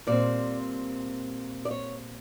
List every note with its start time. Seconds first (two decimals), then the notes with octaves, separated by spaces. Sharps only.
0.07 A#2 G3 C4 D5
1.65 D5
1.71 C#5